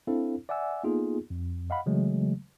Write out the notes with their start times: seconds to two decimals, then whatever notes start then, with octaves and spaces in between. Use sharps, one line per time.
0.07 C4 D4 E4 A4 C5 F5
0.49 D5 E5 F#5 G#5 E6
0.84 A#3 B3 D#4 F4 G#4 A4
1.30 F2
1.70 D#5 F5 F#5 B5
1.86 C#3 E3 F#3 G#3 A3